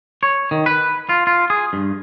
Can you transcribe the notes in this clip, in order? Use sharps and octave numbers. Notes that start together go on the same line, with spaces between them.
C#5
D#3
B4
F4
F4
G#4
G2